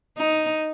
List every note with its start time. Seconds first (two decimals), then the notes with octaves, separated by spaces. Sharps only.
0.18 D#4